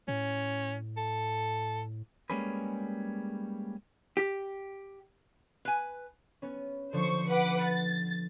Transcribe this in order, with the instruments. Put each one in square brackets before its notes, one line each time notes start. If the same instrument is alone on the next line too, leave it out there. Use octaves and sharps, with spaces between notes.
[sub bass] A2 [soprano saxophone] C#4
[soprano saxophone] A4
[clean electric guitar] G3 G#3 A#3 C#4 G#4 B4
[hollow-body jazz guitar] G4
[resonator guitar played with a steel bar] B4 G#5
[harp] B3 C#4
[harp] D3 F3 [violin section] C5 C#6
[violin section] B4 F#5 D6
A6